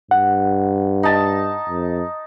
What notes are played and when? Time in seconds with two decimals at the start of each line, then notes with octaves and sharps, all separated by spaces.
0.11 G2 F#5
1.03 D#4 A5
1.69 F2